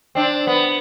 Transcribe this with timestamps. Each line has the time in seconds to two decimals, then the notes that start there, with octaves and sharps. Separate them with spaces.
0.15 C4 D4
0.47 B3